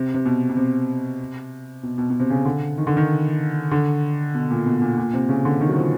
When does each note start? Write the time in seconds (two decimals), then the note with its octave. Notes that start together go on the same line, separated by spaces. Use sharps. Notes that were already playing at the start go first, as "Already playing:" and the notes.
Already playing: C3
0.14 C3
0.25 B2
0.50 B2
0.57 C3
1.83 B2
1.98 B2
2.10 B2
2.20 C3
2.30 C#3
2.45 D3
2.78 D#3
2.87 D3
2.97 D#3
3.71 D3
4.34 B2
4.51 A#2
4.66 B2
4.82 A#2
4.98 A#2
5.13 C3
5.29 C#3
5.45 D3
5.61 D#3
5.69 F#3
5.76 F3